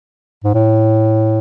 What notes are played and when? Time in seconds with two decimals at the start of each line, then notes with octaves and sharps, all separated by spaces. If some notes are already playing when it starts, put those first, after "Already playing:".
0.44 G#2
0.54 A2